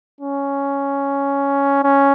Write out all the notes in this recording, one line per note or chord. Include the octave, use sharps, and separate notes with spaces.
C#4
C#4